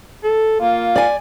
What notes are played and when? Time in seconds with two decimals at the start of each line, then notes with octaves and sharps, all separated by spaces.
0.24 A4
0.61 A#3 F4
0.96 D5 G#5